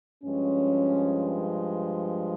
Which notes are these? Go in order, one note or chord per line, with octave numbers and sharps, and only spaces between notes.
G2 F3 G#3 C#4